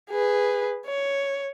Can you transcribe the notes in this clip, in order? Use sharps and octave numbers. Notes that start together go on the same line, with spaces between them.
G#4 B4
C#5